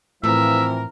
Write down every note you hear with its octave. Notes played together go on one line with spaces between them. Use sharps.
A2 E3 F3 C4 A#4 E5